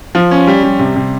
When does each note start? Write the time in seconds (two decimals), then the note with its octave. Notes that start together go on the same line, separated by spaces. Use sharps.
0.15 F3
0.31 C#4
0.47 G3
0.63 G3
0.79 C3
0.96 C3